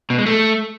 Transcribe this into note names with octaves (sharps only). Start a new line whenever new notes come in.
B2
G#3
A3